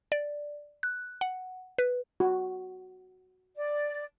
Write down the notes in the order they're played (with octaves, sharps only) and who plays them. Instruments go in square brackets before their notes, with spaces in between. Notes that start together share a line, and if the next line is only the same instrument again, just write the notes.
[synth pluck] D5
F#6
F#5
B4
[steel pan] F#4
[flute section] D5